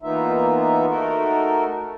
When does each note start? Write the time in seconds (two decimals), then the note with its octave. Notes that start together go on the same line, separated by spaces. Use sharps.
0.03 E3 A#3 B3 D#4 F4 E5
0.88 A3 D#4 F#4 A4 A#4